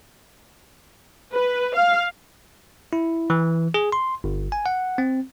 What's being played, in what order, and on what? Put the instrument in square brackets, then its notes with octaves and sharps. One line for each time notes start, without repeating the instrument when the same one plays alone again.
[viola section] B4
F5
[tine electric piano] E4
E3
G#4
C6
G1
G#5
F#5
C4